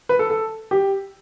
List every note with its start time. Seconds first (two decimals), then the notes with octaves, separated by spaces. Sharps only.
0.09 B4
0.19 A4
0.30 A4
0.71 G4